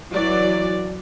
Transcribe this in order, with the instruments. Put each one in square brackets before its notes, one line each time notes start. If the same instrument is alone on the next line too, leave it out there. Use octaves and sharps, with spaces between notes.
[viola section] E3 F#3 D5